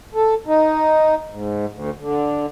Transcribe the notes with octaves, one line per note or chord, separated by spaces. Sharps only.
A4
D#4
G#2
D2
D3